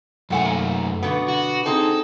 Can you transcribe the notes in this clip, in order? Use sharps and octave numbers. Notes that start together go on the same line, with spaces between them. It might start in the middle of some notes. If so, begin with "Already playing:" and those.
F#2 A2 A3 F#5 G#5
A#3
B2 D3 B3
F#4
C4 D#4 G#4 A4